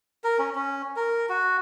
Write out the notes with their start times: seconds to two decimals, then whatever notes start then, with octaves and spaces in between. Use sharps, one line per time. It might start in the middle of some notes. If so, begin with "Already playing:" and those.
0.24 A#4
0.39 C#4
0.55 C#4
0.96 A#4
1.29 F#4